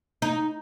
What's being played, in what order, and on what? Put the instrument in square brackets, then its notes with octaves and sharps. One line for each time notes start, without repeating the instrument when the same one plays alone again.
[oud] D#4